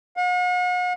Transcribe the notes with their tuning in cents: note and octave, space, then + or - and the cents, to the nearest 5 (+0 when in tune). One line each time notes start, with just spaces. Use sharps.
F#5 -45